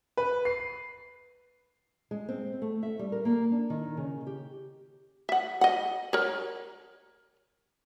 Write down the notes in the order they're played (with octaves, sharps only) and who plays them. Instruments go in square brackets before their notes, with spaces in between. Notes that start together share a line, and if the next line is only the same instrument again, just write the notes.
[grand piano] B4
C7
[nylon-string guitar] G#3
C4
A3
E5
G3
A#4
A#3
D4
D#3
C#3
G4
[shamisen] E5 F#5
D#5 F#5
A#4 C#5